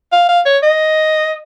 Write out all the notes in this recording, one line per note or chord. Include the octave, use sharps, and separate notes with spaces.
F5
F5
C#5
D#5